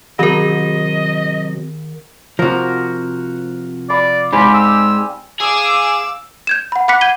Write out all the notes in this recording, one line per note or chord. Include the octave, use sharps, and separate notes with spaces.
C3 D#3 F#3 A#4 D#5
C3 F3 F#4 A#4
D5 F5 B5
G#2 G3 C4 G4 G#5 B5
E6
G#4 F5 D6 E6
G6 G#6 E7
F#5 B5
F#5 B5 D6 F#6 B6 C#7
F#5 G6 G#6 D#7 G7